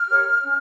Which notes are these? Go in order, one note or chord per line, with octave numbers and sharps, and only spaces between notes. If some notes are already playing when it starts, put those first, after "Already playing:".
Already playing: F6
G4 A#4 C#5
C#4